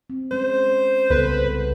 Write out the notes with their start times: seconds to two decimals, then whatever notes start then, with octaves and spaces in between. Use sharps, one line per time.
0.10 C4
0.31 G#3 C#4 C5
1.10 C2 C#3 B3 A4 B4